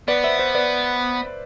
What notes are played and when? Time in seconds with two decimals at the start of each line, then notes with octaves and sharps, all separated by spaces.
0.08 B3 B4 D5
0.23 C5 E5
0.39 C5 E5
0.55 B4 D5